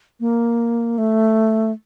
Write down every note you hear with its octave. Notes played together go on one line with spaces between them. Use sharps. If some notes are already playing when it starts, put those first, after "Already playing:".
A#3
A3